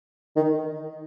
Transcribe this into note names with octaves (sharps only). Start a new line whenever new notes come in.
D#3